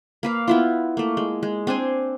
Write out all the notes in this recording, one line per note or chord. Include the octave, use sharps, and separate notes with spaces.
A#3 B4 F5
B3 E4 F4
A3 A#3
G#3
G#3
C4 D4 C5 G#5